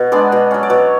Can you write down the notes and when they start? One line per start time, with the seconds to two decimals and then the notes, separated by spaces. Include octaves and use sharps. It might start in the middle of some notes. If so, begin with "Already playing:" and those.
Already playing: B2
0.12 G#3 B3 D4 D5
0.32 B2
0.51 F#3 C#4
0.63 D5
0.70 B2 C#5